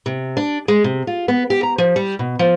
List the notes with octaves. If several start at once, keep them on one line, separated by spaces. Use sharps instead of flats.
C3
D4
G#3
C3
F4
B3
G4
A#5
F3
G3
B2
F3